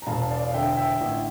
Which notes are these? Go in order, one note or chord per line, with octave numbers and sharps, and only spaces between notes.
A#5
E1 F5 A5
D5 F5
F5
D3 E5 G5
E5 G5
A1